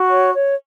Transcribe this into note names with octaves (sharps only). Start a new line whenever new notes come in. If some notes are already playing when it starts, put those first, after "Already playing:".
Already playing: F#4
C#5
C#5